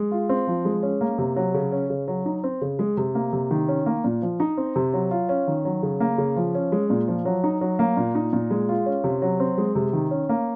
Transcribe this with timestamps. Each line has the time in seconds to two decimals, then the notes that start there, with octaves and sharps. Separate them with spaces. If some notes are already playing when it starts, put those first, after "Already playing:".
Already playing: G#3
0.11 F4
0.29 C4
0.47 F3
0.65 G#3
0.83 C#4
1.01 A#3
1.18 C3
1.36 F#3
1.54 C#3
1.72 C#4
1.90 C#3
2.08 F#3
2.26 D#4
2.44 C4
2.61 C#3
2.79 G#3
2.97 C3
3.15 A#3
3.33 C3
3.51 D#3
3.68 C#4
3.86 A#3
4.04 A#2
4.22 F3
4.40 D#4
4.57 C4
4.76 C3
4.94 F#3
5.11 F4
5.29 C#4
5.47 D#3
5.65 F#3
5.83 C#3
6.00 A#3
6.18 C#3
6.36 F3
6.55 C#4
6.72 G#3
6.90 A#2
7.08 F3
7.25 F#3
7.44 D#4
7.61 F#3
7.79 A#3
7.97 A#2
8.15 D#4
8.33 A#2
8.51 G#3
8.69 F4
8.86 C#4
9.04 C3
9.22 F#3
9.40 C4
9.58 G#3
9.75 C3
9.93 D#3
10.11 C#4
10.29 A#3